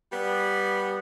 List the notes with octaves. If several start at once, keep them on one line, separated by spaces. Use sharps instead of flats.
G3 B3